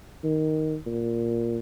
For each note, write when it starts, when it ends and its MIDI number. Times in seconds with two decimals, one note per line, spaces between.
0.24 0.76 51
0.86 1.59 46